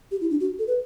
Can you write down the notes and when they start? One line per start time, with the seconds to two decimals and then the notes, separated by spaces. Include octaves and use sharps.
0.11 G4
0.21 E4
0.30 D4
0.40 F#4
0.59 A4
0.67 B4